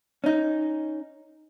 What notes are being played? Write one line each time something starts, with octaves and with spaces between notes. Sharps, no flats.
C#4 D#4